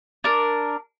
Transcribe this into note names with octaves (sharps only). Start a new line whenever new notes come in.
D4 A#4